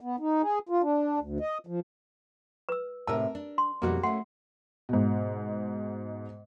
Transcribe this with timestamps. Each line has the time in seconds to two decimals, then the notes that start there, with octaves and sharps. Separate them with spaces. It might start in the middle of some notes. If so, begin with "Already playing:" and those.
0.01 B3
0.20 D#4
0.42 G#4
0.69 F4
0.82 D4
1.20 D2
1.40 D#5
1.67 F3
2.69 B4 E6
3.07 A2 C3 A#4 A5 E6
3.35 D4
3.58 C6
3.82 F2 B2 G3 A#3 F#4
4.03 A3 C#4 F#5 C6
4.89 G#2 B2